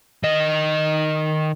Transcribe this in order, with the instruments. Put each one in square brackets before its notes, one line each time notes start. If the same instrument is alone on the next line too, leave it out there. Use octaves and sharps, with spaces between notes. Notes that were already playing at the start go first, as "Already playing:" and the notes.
[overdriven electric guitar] D#3 D#5